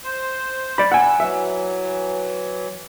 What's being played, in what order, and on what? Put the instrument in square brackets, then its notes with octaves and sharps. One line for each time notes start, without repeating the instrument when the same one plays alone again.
[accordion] C5
[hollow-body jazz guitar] D5 B5
[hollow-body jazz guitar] F#5 G#5 [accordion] E6
[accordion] E3 F#3 [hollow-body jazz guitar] E5